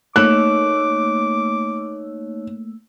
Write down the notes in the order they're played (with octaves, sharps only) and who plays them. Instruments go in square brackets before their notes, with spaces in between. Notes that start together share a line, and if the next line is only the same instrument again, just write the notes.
[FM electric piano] A3 A#3 E6 [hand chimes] D#4 C#5 [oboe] D6 [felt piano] F#6